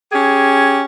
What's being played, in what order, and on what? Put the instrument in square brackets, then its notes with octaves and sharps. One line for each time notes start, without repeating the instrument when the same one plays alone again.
[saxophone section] C#4 G4 G#4